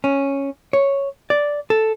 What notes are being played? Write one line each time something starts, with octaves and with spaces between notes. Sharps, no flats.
C#4
C#5
D5
A4